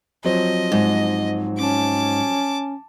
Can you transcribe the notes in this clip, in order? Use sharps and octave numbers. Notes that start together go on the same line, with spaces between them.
F3 F#3 C4 D#5
G#2
C#4 A5 D6